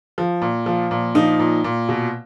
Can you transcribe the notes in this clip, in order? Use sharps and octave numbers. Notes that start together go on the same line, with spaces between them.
F3
A#2
F3
A#2
F3 D#4
A#2
A#2
B2